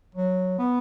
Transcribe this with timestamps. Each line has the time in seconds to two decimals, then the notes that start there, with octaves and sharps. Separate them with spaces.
0.15 F#3
0.58 B3